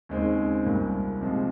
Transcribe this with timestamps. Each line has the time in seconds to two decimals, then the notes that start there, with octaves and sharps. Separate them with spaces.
0.09 D#2 C#3 G#3 C4
0.65 C2 A#2 G3 A#3
1.22 C3 F3 G#3